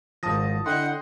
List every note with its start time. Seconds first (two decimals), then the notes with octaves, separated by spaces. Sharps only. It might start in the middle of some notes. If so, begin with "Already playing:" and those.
0.23 G#1 F3 A5 D#6 A#6
0.66 D3 E4 D#5 F#5 G5 C6